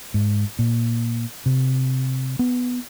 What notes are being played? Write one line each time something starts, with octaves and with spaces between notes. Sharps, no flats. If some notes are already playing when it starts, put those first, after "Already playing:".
G#2
A#2
C3
B3